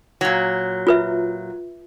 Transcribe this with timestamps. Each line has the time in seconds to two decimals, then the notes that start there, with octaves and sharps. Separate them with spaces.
0.21 A#2 F#3
0.87 F4 B4 E5